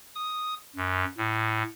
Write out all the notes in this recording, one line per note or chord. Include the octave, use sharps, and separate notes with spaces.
D#6
F#2
A2